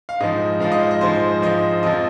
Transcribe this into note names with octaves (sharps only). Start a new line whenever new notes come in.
F5
G#2 F3 D#5
G#2 F3 F5
D#5
C5
D#5
G#2 F3 C5
G#2 F3 D#5
F2 F3 D#5